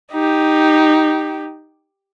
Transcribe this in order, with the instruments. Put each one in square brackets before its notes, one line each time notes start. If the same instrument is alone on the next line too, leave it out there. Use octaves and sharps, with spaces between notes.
[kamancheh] D#4 G4